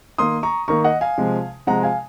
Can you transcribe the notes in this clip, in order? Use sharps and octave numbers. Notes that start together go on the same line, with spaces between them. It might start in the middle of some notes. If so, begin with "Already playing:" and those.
D#3 A#3 C6 D#6
A#5 C#6
D#3 A#3 A#5 C#6
D#5 F#5
F5 G#5
C3 F3 G#3
C3 F3 G#3 F#5 A#5
F5 G#5